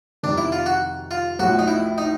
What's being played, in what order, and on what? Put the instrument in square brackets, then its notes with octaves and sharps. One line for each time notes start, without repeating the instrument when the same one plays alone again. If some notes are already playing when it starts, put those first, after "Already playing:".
[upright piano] F2 C3 D#3 [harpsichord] D4
[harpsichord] E4
F4
F#4
F4
[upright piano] B1 A2 F3 [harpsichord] F#4
[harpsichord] D#4
E4
D#4